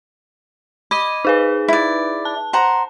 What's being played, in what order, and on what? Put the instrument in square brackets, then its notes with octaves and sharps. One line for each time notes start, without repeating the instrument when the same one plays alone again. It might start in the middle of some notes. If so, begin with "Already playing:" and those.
[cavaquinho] D#5 [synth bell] B5 D6 D#7
[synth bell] D#4 G#4 B4
[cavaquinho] E4 D5
[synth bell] A5
[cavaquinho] C5 F#5 A#5